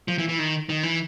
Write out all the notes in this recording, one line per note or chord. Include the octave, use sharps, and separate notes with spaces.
F3
E3
E3
D#3
D#3
E3